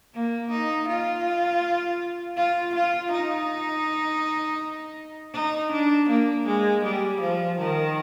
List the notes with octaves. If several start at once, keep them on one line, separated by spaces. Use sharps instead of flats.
A#3
D#4
F4
F4
F4
D#4
D#4
D4
A#3
G#3
G3
F3
D#3